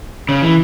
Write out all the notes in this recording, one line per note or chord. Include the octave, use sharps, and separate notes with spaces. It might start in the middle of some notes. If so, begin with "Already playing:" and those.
C#3
E3